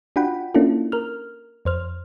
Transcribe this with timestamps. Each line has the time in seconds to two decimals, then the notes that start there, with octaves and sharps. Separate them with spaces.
0.16 D4 F4 F#4 F#5 G5 B5
0.55 A#3 C#4 D4 E4 F4 A4
0.92 A#4 F6
1.65 F2 C5 F6